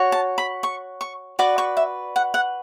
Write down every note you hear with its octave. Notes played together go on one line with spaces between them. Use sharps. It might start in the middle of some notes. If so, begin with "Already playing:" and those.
Already playing: F#4 C#5
A5
B5
C#6
C#6
F#4 B4 D5 D6
C#6
E5
F#5
F#5